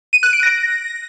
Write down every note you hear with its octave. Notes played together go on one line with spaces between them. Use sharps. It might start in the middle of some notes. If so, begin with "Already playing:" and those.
D#7
F#6
D7
A#6